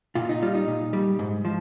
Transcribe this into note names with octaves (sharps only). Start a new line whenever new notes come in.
A#2 F4
D#4
G3 F4
D#4
A#2
G3
G#2
F3